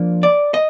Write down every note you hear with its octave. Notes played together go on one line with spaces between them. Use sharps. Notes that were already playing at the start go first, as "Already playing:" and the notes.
Already playing: F3 A#3 D4
D5
D#5